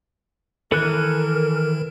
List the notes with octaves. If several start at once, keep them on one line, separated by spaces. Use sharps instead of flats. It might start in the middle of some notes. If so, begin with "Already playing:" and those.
D#3 E3 A4 A#4 F#6